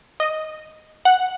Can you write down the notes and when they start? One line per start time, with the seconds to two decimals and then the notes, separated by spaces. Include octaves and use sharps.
0.20 D#5
1.05 F#5